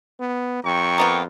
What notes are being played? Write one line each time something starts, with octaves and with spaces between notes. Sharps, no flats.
B3
F2 G5 A#5 C#6
A#3 B3 F4